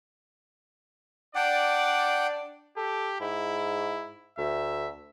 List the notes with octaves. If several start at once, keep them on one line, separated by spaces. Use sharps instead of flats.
D4 D5 F#5 G5
G4 A4
G#2 E4
D2 E5